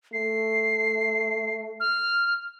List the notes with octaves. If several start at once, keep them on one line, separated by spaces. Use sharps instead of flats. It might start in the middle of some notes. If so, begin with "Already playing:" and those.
A3 C7
F6